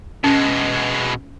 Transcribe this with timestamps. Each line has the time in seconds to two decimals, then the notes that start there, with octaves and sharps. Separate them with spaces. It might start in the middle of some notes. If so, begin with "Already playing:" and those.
0.24 B2 G#3 C#4